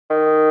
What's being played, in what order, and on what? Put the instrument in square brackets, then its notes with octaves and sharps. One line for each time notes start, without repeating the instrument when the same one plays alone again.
[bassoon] D#3